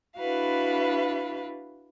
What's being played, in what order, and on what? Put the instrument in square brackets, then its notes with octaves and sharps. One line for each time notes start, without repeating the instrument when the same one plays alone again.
[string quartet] D4 E4 F#4 B4 F5